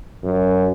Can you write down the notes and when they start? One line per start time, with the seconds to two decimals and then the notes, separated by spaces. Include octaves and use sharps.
0.24 F#2